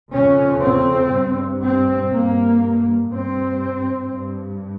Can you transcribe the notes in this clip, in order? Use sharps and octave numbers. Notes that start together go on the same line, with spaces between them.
F2 C#3 C#4
C4
G2
C4
G2 A#3
G2 C4
G2